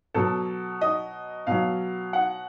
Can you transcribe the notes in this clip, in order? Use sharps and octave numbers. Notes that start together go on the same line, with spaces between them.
B2 F#3 A4
D#5
B2 F#3 F5
F#5